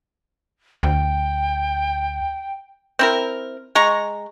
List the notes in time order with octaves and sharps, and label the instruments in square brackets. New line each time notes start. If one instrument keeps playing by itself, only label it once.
[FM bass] D2 [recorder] G5
[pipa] C4 E4 A#4
G#3 A#5 C#6